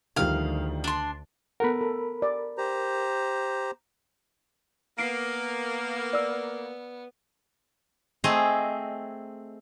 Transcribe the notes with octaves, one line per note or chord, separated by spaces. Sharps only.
D2 D#3 F3 G3 F5 F6
D4 C6
B3 A4 A#4 F#5 B5
A4
D5
G4 C5 A#5
A#3 B3 C7 D7
D5 E6
A3 C4 G#4 D#5